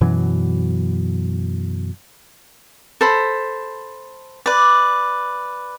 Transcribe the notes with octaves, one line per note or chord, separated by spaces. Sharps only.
F#2 B2 E3 F#3
A4 C5 B5
B4 D5